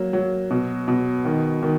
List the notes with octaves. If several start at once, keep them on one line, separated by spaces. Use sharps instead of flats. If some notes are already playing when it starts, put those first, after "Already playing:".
Already playing: F#3 A#3
F#3
B2
B2
D#3
D#3